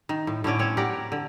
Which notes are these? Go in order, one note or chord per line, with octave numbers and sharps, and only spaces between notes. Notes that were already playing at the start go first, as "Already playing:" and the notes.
D#3
A2
A2 D3 C#4 D5
C4 C#4 C#5
G4 A#4 D5 F#5
D3